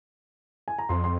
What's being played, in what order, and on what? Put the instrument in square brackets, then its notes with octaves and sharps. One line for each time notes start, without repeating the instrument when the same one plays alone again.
[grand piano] G#5
A#5
[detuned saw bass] F2 [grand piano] C6
[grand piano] C6